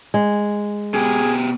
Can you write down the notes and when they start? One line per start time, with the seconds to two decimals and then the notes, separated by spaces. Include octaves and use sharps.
0.14 G#3
0.94 B2 G4 G#4